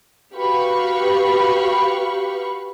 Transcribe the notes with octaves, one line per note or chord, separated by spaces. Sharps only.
F#4 G4 B4 F5 B5 C#6